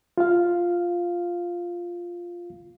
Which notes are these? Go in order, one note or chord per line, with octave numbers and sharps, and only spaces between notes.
F4 F5